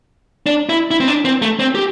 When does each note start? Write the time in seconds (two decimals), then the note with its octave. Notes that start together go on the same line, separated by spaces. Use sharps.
0.46 D4
0.69 E4
0.91 E4
1.00 C4
1.08 D4
1.25 C4
1.42 A3
1.60 C4
1.75 G4